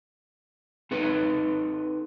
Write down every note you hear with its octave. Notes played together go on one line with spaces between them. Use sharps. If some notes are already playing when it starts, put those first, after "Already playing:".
C4 D#4 A4 B4